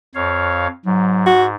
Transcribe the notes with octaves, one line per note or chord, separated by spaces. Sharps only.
F2 C#5 F5
G#2 F#3
F#4